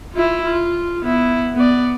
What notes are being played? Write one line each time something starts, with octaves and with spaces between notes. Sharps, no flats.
E4 F4
F4
B3 E4
B3 D5